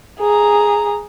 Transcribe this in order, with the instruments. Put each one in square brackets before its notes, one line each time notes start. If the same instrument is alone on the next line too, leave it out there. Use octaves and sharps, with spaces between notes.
[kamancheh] G#4 A#5